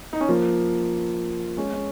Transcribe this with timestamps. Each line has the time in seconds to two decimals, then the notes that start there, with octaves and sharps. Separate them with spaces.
0.13 D#4
0.21 C#4
0.29 F3 A#3
1.57 G#3 C#4
1.73 C#4